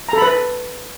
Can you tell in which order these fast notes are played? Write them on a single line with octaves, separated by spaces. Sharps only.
A#5 A4 B5 B4